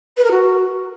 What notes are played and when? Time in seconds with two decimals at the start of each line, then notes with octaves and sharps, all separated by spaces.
0.17 B4
0.24 A#4
0.31 F#4